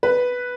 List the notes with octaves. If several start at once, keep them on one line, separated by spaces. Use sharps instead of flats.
B4